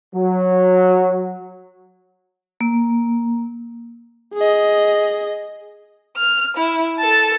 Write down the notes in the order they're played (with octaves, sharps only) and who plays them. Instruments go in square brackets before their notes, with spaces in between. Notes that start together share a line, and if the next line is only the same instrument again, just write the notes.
[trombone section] F#3
[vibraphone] A#3
[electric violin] G#4 D#5
[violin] F6
E4
A4 A5